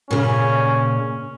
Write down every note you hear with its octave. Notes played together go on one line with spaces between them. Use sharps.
A#2 C#3 C#4